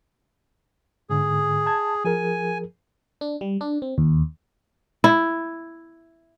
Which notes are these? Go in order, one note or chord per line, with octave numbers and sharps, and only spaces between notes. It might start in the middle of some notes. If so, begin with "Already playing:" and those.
G#2 D3 G#4
A5 G#6
F3 G#4 A#4 G#5
D4
G3
D4
C4
D#2
E4